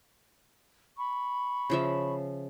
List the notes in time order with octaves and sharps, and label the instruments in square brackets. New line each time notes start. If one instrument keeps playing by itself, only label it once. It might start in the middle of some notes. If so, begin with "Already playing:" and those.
[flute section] B5 C#6
[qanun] C#3 F3 E5